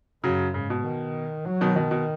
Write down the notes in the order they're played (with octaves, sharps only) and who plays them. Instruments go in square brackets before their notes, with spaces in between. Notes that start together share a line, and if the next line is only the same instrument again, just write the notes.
[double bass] F#2 [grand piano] C#3 F#3
[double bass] G#2 [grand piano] C#3
[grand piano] B2
[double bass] D#3
F#3
[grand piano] B2 D#3
[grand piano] B2 [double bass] D#3
[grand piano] B2